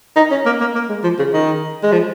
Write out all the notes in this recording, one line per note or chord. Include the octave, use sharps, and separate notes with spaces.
D#4
C#4
A#3
A#3
A#3
G#3
F3
C#3
D#3
G#3
F3